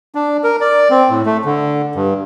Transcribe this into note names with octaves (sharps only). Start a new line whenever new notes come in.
D4
A#4
D5
C4
A2
A3
D3
G2